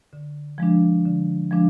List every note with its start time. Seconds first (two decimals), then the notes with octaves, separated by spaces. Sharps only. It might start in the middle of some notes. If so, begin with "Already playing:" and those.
0.13 D3
0.58 F3 G#3 D4
1.05 D3
1.51 F3 G#3 D4